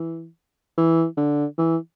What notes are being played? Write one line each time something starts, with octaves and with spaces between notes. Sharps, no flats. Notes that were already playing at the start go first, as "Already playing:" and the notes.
Already playing: E3
E3
D3
E3